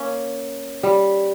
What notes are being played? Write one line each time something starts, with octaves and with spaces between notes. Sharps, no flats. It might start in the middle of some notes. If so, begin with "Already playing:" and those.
Already playing: A#3 C#4
G3